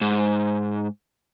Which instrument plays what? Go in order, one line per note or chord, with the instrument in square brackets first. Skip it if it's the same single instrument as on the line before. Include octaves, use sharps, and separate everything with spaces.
[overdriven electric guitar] G#2